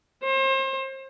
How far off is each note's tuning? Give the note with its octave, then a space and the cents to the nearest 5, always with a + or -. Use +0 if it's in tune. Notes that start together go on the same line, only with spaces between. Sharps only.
C5 +35